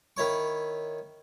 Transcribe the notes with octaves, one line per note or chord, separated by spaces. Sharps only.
D#3 E4 C#5 C#6